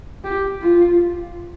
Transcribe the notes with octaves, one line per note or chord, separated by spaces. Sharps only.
G4
F4